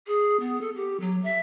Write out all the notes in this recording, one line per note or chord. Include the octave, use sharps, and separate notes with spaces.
G#4
B3
A4
G4
F#3
E5